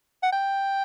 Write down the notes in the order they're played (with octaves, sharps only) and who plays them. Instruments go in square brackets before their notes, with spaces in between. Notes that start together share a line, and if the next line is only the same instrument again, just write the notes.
[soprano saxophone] F#5
G5